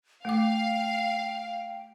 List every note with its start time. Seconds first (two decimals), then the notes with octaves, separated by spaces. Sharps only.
0.25 A3 F5 G5 D6